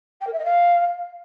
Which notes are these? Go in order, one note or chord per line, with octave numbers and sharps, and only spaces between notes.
G5
A#4
E5
D#5
F5